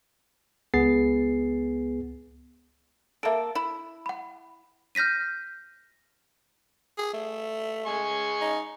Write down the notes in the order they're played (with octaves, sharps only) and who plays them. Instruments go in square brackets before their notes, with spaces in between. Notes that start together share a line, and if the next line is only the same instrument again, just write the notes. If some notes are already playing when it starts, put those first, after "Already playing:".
[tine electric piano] C#2 B3 G#4 A6 C7
[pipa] A#3 A4 [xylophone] E5 D7
[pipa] E4
[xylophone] F#5 B5
F6 G6 A#6 B6 D#7
[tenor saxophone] G#4
A3
[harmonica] G#3 G#5 C#6
[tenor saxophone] D#4